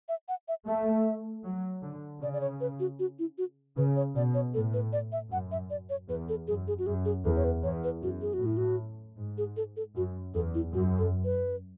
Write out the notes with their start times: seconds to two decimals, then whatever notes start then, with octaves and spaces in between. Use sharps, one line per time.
0.09 E5
0.28 F#5
0.48 E5
0.67 A3 E5
1.45 F#3
1.83 D3
2.22 C#3 D5
2.34 D5
2.41 C#5
2.61 B4
2.80 F#4
2.99 F#4
3.19 E4
3.38 F#4
3.77 C#3 B4
3.96 C#5
4.15 B2 D5
4.34 C#5
4.54 A2 A4
4.73 B4
4.93 D5
5.12 E5
5.31 F#2 F#5
5.51 E5
5.70 D5
5.90 C#5
6.08 E2 B4
6.29 A4
6.48 F#2 G#4
6.68 G#4
6.79 F#4
6.86 F#2 G#4
7.05 G#4
7.25 E2 A4
7.36 C#5
7.44 B4
7.63 E2 C#5
7.84 B4
8.02 F#2 F#4
8.22 G#4
8.33 F#4
8.41 A2 E4
8.57 F#4
9.19 G#2
9.38 G#4
9.57 A4
9.77 A4
9.96 F#2 F#4
10.35 E2 A4
10.55 E4
10.73 F#2 F#4
10.99 A4
11.24 B4